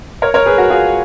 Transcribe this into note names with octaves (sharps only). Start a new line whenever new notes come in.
A#4 C#5
A#4 C#5
G#4 B4
F#4 A#4
F4 G#4